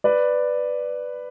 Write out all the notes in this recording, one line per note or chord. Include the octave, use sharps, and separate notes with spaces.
B4 D5